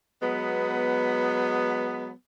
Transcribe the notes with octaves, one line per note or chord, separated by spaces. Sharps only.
F#3 G#3 B3